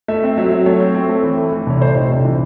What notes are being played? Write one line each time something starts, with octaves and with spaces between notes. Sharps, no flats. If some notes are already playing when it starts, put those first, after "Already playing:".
A3 E5
C4
F#3 E5
F#3
A3 C#5
C4
C4
A3
E3
A3
E3
C2 C#5
A3 C5
C3 D#4
C2 E4
E3 E4